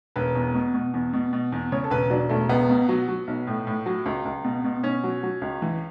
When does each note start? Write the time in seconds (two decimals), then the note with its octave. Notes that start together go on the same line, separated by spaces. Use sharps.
0.16 E1 B4
0.35 E2
0.55 B2
0.74 B2
0.94 E2
1.13 B2
1.33 B2
1.52 E2
1.72 C#3 C#5
1.84 A4
1.90 E1 B4
2.10 F#3 D4
2.29 E1 A3
2.49 C#2 B3
2.69 B2
2.89 F#3
3.08 F#3
3.27 B1
3.47 A2
3.67 A2
3.86 F#3
4.06 C#2
4.25 C#2
4.44 B2
4.64 B2
4.83 B2 C#4
5.04 F#3
5.23 F#3
5.41 C#2
5.62 E3